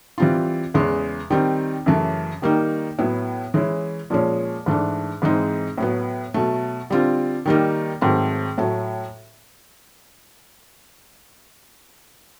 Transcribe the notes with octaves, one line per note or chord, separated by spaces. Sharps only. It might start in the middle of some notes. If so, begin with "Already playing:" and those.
E3 G3 C4 F4
E2 C#3 E3 G#3
D#3 G3 C4 D#4
F#2 C#3 E3 A3
D#3 G3 A#3 D#4
A2 F#3 B3 E4
E3 G#3 C#4 E4
A#2 F3 G#3 C#4
G#2 E3 A3 D4
G#2 E3 G#3 C4 D#4
A2 F#3 B3
B2 F#3 A3
D3 G3 C4 F4
D#3 G3 A#3 D#4
G#2 D#3 F#3 A3 C4
A2 F#3 A3